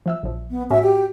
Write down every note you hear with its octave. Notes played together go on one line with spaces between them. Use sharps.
F3 E5 E6
A#1 F3
B3
A2 C#4 F#4 E5
G4